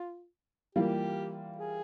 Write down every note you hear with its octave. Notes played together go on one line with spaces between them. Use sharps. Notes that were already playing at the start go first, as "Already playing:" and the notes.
Already playing: F4
E3 G3 A#3 F4 G4
G#4